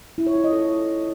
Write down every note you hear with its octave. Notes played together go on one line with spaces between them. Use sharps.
E4
C#5
F4
D#5
A4